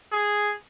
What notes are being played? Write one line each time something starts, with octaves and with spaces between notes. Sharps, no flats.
G#4